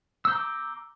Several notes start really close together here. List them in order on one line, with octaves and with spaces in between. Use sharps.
E6 G6 A#5 D6